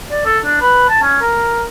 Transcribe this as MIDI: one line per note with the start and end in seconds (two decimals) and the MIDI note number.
0.11 0.22 74
0.25 0.39 69
0.44 0.59 62
0.61 0.88 71
0.89 1.01 81
1.02 1.21 61
1.21 1.64 70